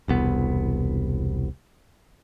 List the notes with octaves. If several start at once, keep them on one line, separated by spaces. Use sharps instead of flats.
E1 C2 B3